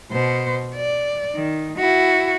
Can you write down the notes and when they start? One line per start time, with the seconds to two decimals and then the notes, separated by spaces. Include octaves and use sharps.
0.11 B2 C5
0.75 D5
1.35 D#3
1.78 E4 F#4